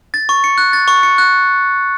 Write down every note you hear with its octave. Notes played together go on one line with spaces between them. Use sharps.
A6
C#6
C#7
F#6
A6
C#6
C#7
F#6